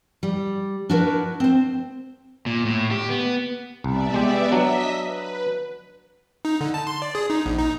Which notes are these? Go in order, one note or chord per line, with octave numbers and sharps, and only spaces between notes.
G3
D4 E4 F#4 A#4 B4
C4 C5
A#2
A2
G4
B3
C2 B3 D5 E5
G#3 G4
F#3 D4 D#5 E5 B6
B4
D#4
D3
A5
C6
D5
G#4
D#4
A#1
D#4